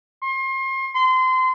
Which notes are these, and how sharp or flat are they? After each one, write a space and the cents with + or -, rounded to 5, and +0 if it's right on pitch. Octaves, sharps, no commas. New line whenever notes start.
C6 +35
C6 -25